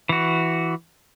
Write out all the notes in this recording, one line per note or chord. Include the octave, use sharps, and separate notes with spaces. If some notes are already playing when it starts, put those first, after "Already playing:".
E3 F#4